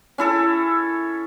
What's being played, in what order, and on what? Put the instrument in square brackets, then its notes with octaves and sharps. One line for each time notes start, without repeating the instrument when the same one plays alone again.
[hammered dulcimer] C#4 E4 A4